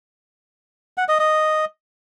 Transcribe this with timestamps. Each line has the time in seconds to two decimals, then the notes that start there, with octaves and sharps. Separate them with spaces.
0.98 F#5
1.09 D#5
1.19 D#5